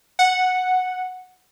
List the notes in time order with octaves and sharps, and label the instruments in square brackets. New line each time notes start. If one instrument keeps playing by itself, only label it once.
[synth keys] F#5